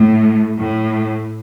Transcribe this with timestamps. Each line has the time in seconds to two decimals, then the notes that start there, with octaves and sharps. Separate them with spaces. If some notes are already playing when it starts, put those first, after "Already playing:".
Already playing: A2
0.57 A2